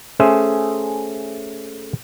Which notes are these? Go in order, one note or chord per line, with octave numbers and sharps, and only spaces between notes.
A3 C#4 G#4 C5 E5